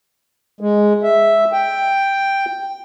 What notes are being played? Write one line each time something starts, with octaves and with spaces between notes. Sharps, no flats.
G#3
E5
G5